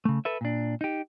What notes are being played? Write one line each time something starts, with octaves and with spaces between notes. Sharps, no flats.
C#3 A3
A4 B4 E5
A#2 D4
D#4 G4